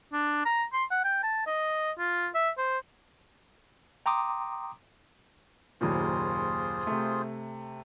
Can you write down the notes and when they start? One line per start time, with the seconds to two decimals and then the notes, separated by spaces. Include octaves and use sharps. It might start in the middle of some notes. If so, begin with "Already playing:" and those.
0.13 D4
0.45 A#5
0.73 C6
0.91 F#5
1.04 G5
1.23 A5
1.46 D#5
1.99 F4
2.35 E5
2.58 C5
4.06 G5 A#5 C6 D6 D#6
5.81 F#1 D#2 A#2 F4 G#4 C5
6.87 C3 A3